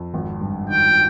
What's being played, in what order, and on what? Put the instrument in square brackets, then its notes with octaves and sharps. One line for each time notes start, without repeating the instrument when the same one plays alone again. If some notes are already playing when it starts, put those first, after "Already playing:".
Already playing: [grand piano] F2
G#1
G2
[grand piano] D#3 [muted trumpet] G5